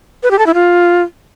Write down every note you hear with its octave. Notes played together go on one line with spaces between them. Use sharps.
B4
G4
A4
E4
F4